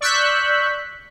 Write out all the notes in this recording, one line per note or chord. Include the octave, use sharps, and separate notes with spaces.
D5 C#6 E6 F#6 G6 B6